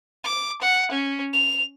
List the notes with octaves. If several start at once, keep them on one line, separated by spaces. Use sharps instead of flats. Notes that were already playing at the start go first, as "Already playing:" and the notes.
D6
F#5
C#4
F7